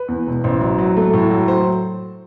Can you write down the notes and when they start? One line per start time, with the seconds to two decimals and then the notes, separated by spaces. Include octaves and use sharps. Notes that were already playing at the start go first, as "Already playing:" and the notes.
Already playing: B4
0.08 E2
0.27 E1
0.44 A1 C5
0.61 F#3
0.79 F#3
0.97 A3
1.13 A2
1.31 F#3
1.48 C5